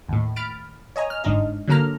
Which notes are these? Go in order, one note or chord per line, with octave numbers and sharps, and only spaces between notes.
D#2 A2
B5 F6 A6 D7
C#5 D#5 G#5 A#5
F6
G1 G#2 D4 D#4 D#5
D3 F#3 A#3 A4 A#5 F6